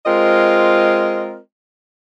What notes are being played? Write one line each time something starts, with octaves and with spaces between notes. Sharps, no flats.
G#3 C4 F4 A#4 D#5